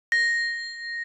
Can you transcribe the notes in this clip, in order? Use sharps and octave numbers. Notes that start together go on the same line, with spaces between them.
A#6